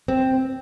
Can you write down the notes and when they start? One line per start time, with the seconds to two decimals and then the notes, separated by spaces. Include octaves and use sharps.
0.08 C4